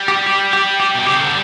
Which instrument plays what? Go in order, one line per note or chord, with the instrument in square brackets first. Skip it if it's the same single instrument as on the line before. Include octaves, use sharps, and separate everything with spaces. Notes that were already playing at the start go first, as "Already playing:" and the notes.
Already playing: [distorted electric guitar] G3
[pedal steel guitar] G4
G4
G4
G4
[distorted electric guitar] B2
[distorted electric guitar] C#3 [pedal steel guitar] G4
[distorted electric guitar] D3